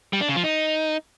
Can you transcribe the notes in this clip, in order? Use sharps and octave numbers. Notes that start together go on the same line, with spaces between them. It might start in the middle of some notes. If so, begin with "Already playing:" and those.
G3
D4
C#3
F3
D#4